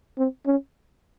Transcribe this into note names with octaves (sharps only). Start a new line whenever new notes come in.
C4
C#4